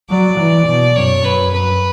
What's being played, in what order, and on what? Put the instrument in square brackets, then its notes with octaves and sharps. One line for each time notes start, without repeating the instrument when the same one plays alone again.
[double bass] F#3 [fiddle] D5
[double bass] E3
B2
[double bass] F#2 [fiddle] C#5
[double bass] F#2 [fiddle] B4
[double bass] F#2 [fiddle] B4